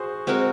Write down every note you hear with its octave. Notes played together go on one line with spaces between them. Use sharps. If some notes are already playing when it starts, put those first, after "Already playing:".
Already playing: F#4 G#4 C5
G#3 C4 F#4 A#4